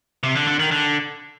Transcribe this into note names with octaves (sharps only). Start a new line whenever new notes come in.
C3
D3
D3
D#3
D3